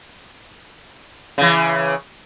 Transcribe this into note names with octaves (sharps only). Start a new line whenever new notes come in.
C#3 E3